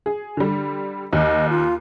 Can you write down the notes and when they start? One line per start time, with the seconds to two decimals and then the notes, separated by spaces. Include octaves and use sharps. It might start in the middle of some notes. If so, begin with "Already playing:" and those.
0.06 G#4
0.37 D3 G3
1.13 D#2 D#5
1.49 F4